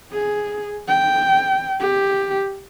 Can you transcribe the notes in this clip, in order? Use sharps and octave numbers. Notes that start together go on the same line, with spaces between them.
G#4
G5
G4